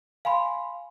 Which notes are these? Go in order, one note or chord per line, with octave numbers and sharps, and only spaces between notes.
F5 G#5 B5 C6